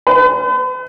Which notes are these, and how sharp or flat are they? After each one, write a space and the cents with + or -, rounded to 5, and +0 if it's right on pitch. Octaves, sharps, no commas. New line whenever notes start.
B4 +45